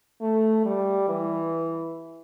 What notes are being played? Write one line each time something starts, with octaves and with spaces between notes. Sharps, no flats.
A3
G3
E3